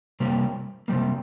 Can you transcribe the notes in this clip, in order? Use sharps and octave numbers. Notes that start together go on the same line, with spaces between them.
C3 G3 A#3
C3 G3 A#3